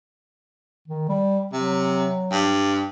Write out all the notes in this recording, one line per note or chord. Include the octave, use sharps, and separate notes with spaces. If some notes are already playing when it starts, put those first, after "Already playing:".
D#3
G3
C3 F#3
G2